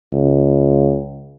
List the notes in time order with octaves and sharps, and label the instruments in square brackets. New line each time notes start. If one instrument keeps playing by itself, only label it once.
[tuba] C#2